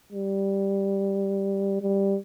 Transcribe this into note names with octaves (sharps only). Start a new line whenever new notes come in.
G3
G3